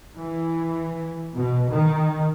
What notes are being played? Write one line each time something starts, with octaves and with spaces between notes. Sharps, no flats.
E3
B2
D#3